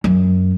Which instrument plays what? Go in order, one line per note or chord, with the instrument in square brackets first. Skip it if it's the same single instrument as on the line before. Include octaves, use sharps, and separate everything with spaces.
[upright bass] F#2